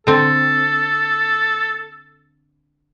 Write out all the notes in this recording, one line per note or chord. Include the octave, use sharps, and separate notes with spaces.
D3 C4 A4